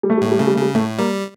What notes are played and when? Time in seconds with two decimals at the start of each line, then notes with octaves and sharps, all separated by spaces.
0.03 G3
0.10 A3
0.18 G3
0.21 A2 A3
0.31 G3
0.39 C#3 A3
0.47 G3
0.54 A3
0.57 C#3 G3
0.74 A2 A3
0.98 G3 A#3